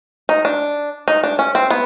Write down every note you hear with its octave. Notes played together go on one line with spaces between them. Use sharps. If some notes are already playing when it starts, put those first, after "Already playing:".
D#4
D4
D#4
D4
C#4
C4
B3